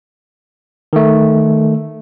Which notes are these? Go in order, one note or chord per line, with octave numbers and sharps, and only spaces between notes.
D#3 A3